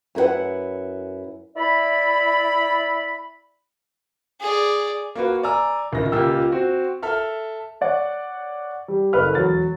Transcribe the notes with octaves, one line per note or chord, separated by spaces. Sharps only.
F#2 E4 A#4 B4 F#5
E4 D5 B5
G#4 D5
A#3 F#4 B4
D5 G#5 A#5 E6
D1 C#2 D#3 E4 A#6
C#2 A#2 A#3 G4 E6
C4 F#4
A4 E5 F6
C#5 D5 F#5
G3
F#1 A4 B4 F6
E1 F#3 A6